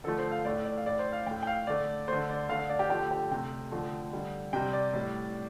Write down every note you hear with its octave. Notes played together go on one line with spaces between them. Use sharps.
D3 F3 A3 A4
C5
F5
A2 A3 D5
D5
F5
A2 A3 D5
C5
F5
A2 A3 G5
G5
F5
D3 A3 D5
D3 A3 C5
D5
D3 A3 F5
F5
D5
G4
D3 F3 A3 G4
G4
C3 A3 G5
D3 F3 A3
D3 G3
C3 G3 G5
D5
A2 G3